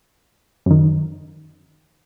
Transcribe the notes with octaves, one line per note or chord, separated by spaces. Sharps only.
F#2 D#3